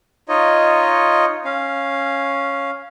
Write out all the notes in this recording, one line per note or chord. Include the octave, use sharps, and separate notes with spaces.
D#4 F4 C#5 D#5
C#4 F5